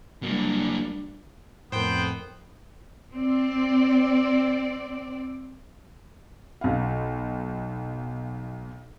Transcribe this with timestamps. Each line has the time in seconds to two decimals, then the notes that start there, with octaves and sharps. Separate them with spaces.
0.23 F#3 G3 A#3 D4
1.72 F2 A2 F3 B3 A#4 C5 G5
3.14 C4 D5
6.61 B1 F5